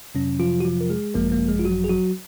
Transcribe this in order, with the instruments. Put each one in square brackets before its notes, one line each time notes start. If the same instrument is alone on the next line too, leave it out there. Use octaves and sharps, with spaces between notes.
[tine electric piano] F2 C3 F#3 C#4
F3 F4
F#4
F3 F4
A#4
G#3 G#4
G#1 F#2 F3 G#3 A#3 A#4
A#3 A#4
G#3 G#4
F4
F#3 F#4
G#4
F#3 F#4